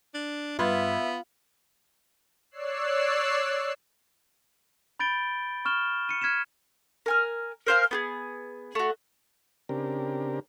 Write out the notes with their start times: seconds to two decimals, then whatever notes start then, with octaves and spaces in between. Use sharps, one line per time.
0.14 D4
0.59 G2 B3 F4 B4 E5 G#6
2.51 C#5 D5 E6 F#6 C7
5.00 B5 G6 A6 D7 G7
5.65 C#6 F6 E7 G7
6.09 C#7 D#7
6.21 F6 G#6 B6 C#7 E7
7.06 A#4 G#5 F6
7.67 A#4 C5 F5 G#5
7.91 B3 G4 G#4
8.75 A3 F#4
9.69 C#3 C4 D4 G4 A#4